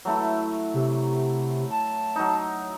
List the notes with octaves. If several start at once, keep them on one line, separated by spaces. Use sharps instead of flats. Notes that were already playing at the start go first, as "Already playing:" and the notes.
F#3 A3 E4
C3
A5
F#3 D#4